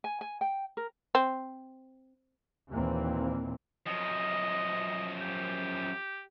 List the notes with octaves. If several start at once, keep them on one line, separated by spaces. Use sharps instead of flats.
G#5
G#5
G5
A#4
C4
D#2 A#2 E3 A#3 C4
F#2 F3 D#5
G4